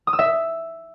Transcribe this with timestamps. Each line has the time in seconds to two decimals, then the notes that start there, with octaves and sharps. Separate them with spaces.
0.07 D#6
0.13 E6
0.19 E5